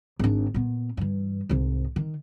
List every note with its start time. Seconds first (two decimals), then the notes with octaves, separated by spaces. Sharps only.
0.19 G#1 D4
0.54 A#2 B3
0.97 G2 E3
1.49 C2 G#2
1.96 D#3